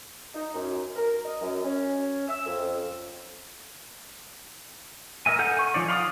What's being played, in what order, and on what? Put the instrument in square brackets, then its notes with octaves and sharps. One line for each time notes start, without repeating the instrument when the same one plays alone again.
[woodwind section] D#4
F#2
A#4
D#5
F#2
C#4
E6
F2
[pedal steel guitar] A#4 D#5 E5 G#5
D#4 A4 F#5 F6 G6
G#5 C#6
F3 D#4 C#5 D5
F5 B5 D#6